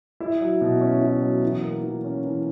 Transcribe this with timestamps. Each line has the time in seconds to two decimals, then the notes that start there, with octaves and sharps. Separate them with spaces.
0.20 E4
0.41 F#3
0.61 B2
0.81 C#4
1.02 E4
1.22 F#3
1.43 E3
1.63 A#3
1.83 E3
2.04 C#4
2.24 E3